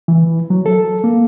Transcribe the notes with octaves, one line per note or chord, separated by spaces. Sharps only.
E3
F#3
A4
A#3